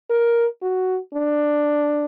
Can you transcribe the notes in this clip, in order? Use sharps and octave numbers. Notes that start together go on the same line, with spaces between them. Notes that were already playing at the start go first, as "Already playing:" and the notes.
A#4
F#4
D4